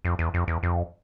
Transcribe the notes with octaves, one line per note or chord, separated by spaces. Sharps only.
F2
E2
F2
E2
F2